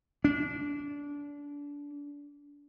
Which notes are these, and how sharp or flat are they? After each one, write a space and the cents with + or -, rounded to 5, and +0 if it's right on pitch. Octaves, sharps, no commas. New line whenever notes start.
D4 -25